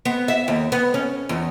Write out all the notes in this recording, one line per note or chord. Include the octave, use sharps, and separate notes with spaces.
B3
E5
D#2
B3
C#4
E2